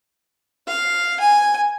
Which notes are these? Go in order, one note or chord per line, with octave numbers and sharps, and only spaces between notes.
F5
G#5